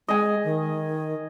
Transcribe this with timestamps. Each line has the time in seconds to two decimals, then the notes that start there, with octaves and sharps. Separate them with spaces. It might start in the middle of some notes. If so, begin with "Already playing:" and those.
0.08 G#3 D#5 G#5
0.44 D#3